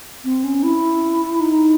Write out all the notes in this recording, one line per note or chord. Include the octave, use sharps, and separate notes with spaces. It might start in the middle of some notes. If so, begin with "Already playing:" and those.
C4
C#4
E4
D#4